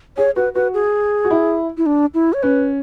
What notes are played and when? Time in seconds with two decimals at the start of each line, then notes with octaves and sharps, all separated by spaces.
0.17 G#4 C#5
0.36 F#4 B4
0.55 F#4 B4
0.74 G#4
1.24 F#4
1.30 E4
1.78 E4
1.86 D4
2.14 E4
2.33 C#5
2.43 C#4 B4